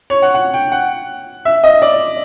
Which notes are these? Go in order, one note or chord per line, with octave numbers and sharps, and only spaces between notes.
C#5
F#5
F#5
G5
F#5
E5
D#5
D5